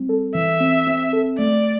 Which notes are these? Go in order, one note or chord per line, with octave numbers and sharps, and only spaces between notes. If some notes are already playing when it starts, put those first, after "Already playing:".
Already playing: G3 C4
A4
E3 E5
C4
C4
A4
A3 D5